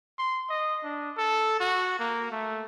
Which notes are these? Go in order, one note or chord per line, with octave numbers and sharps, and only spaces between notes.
C6
D#5
D4
A4
F#4
A#3
A3